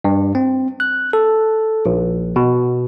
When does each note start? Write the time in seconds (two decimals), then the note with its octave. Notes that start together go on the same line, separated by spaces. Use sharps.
0.04 G2
0.35 C4
0.80 F#6
1.13 A4
1.86 A#1
2.36 B2